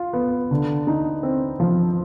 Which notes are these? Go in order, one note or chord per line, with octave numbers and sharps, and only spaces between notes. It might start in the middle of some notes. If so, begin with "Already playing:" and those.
Already playing: F4
B3
D3
D#4
C4
F3